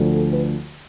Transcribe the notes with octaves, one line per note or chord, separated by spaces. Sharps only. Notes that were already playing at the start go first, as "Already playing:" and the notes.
Already playing: D2 D3 F3
A4
B4